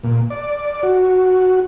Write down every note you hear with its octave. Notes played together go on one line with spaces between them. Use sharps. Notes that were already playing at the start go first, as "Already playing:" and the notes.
A#2
D5
F#4